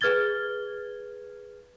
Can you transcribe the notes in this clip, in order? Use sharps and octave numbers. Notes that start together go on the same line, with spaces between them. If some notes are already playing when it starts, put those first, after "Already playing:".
G#4 B4 F6 G#6 A6 G7